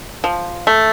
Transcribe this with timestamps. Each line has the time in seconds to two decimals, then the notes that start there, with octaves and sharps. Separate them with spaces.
0.24 F3
0.67 A3